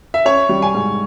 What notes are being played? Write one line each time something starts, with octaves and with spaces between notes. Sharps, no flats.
E5
C#4 C#5
G3
G#5
G#2